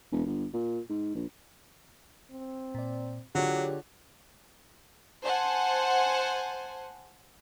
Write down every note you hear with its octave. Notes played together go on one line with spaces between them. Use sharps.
E1
G1
A#2
G#2
A#1
C4
A#2 D5
D3 F#3 F4 G4 G#4 C#5
C5 F#5 G#5 A5